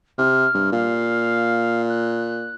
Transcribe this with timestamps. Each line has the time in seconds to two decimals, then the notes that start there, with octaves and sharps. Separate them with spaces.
0.18 C3 F6
0.54 G2
0.72 A#2 F5
1.89 F#6